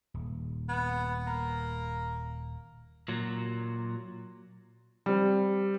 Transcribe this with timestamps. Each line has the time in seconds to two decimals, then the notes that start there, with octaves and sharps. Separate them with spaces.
0.14 D#1
0.69 B3
1.27 A#3
3.08 A#2 F#3
5.06 G3 C4